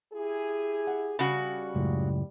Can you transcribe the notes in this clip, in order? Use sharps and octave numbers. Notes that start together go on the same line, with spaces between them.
E4 G4 G#4
F#5
C#3 G3 F#4 B5
C#2 F#2 A2